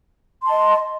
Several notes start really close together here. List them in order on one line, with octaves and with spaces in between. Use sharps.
C6 A5 D#5